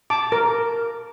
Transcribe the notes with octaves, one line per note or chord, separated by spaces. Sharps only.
A5 D6
A#4